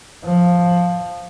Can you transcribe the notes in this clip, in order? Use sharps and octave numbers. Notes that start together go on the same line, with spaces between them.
F3